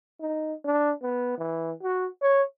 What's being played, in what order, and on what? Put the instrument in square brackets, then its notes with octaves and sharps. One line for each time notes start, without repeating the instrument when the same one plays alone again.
[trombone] D#4
D4
B3
E3
F#4
C#5